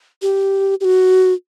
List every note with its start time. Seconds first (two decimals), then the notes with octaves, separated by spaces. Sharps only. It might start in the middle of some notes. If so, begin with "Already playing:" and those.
0.22 G4
0.81 G4
0.85 F#4